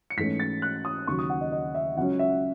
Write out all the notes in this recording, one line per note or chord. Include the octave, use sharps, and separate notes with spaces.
C#7
G#2 E3 A3 C#4 B6
A6
F#6
D#6
D#2 C#3 F#3 C#6
D#6
F#5
D#5
D#5
E5
C#2 C#3 F#3 C#4 F#5
E5